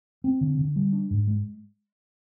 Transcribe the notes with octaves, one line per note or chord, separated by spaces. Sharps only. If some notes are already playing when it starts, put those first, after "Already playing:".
C4
D3
D3
G3
D4
G#2
G#3